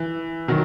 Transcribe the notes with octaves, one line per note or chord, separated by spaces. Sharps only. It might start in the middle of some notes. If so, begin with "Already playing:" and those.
Already playing: E3
D#3 F#3